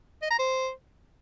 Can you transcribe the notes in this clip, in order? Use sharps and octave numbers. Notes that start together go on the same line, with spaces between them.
D#5
A#5
C5